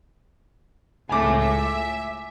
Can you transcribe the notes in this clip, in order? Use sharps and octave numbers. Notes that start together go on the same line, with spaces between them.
C#2 A2 A3 G#5 D6
E5